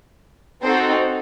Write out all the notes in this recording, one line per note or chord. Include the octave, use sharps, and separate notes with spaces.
C4 D#4 F#4 A4 C5